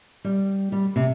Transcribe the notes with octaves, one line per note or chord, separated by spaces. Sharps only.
G3
G3
C3